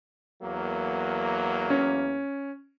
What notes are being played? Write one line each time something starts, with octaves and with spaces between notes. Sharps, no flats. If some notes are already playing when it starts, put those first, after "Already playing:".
E2 F#3 A#3
C#4